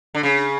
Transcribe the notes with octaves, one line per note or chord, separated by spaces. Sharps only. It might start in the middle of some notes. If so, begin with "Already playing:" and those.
D3
C#3